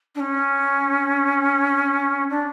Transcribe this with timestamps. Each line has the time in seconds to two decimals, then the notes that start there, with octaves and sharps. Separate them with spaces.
0.15 D4
0.20 C#4
2.30 D4